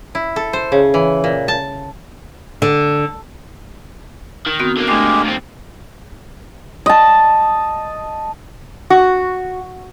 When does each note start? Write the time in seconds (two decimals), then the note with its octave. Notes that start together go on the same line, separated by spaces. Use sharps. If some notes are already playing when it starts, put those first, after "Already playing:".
0.15 E4
0.36 A4
0.53 C5
0.72 C#3
0.94 E3
1.24 A#2
1.48 A5
2.62 D3
4.47 D#3
4.59 B3 C4 F#4
4.77 D3 A#3
4.88 G#3 A3 D4 G4
5.25 D#2 C4
6.86 D#5 A5
8.90 F#4